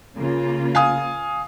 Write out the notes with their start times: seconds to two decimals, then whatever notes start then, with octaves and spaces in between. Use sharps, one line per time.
0.15 C#3 A#3 F4
0.75 F5 G#5 D#6